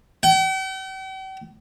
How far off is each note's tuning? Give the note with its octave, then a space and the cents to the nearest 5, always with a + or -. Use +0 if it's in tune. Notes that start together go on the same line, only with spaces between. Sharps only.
G5 -45